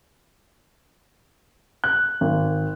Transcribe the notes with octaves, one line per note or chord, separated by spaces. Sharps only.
F#6
G#1